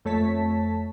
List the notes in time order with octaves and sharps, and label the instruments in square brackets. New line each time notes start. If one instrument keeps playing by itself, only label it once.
[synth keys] F2 A3 C#5 A5 B6